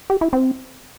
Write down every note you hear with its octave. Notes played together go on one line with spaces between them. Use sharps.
G4
E4
C4